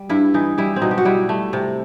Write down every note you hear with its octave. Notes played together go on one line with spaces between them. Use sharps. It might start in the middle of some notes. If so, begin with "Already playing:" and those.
Already playing: G3
G2 E4
E3 D#4
G3 E4
C4
B2 D#4
G4
F#4
G3 E4
A3
C3